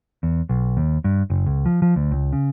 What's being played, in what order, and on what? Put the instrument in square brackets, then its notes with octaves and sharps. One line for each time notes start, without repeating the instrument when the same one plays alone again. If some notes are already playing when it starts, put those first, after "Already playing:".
[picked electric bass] E2
B1
D#2
G2
F#1
C#2
F3
F3
D2
C#2
C#3